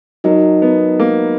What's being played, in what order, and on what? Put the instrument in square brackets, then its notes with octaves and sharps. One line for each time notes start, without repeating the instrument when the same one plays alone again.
[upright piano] F#3 [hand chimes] D#4 A#4 D#5
[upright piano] B3
A#3